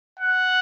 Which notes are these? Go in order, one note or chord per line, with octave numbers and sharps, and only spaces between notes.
F#5